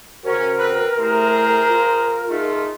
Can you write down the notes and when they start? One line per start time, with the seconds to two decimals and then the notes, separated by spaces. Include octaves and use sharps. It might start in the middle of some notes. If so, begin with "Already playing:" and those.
0.24 C#3 C#4 F#4 A#4 C5
0.58 C4 B4
0.98 A3 E4 G4 G#4 C5 A#5
1.69 F4
2.28 A3 D#4 F4 G#4